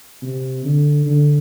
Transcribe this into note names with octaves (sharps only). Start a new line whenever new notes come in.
C3
D3
D3